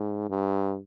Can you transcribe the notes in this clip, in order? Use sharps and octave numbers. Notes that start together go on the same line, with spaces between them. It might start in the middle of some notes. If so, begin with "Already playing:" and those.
Already playing: G#2
G2